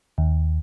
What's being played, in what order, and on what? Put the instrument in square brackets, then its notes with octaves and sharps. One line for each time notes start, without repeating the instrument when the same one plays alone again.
[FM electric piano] D#2